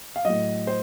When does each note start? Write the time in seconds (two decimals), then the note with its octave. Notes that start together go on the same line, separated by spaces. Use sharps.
0.16 F5
0.25 A2 F#3 D#5
0.67 C5